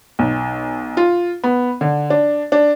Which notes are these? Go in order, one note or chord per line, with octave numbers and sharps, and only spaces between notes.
B1
F4
B3
D3
D4
D4